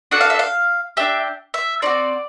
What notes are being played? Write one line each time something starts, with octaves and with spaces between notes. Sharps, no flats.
D4 F#4 A4 F#5
F5
E5
F5
D4 G4 E5
E5
C4 D#4 F#4 D5